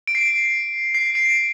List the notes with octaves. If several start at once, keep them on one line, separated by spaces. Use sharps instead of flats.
D7
C7
C7
D7